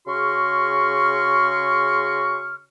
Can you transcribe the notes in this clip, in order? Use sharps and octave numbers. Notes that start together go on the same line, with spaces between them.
C#3 F#4 G#4 C6 C#6 F6